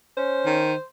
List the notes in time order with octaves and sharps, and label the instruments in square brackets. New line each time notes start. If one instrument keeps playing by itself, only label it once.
[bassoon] C#4 [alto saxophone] C5
[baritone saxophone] D#3